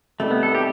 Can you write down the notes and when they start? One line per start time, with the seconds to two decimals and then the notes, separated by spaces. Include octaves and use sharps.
0.20 C3 D#3 G3 A3
0.31 B3
0.43 A4
0.55 G4